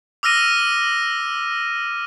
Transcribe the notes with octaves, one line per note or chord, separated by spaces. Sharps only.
D6 E6 F6 A#6 D#7